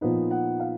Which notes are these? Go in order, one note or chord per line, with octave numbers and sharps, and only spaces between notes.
A#2 F3 B3 D#4
F#5
F5